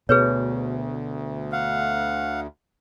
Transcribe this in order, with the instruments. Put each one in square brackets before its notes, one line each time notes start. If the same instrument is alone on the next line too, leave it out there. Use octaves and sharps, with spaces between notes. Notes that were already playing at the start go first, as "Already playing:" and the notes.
[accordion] D2 [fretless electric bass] B2 [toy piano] G#4 B4 C#5
[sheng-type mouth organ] F5 F#5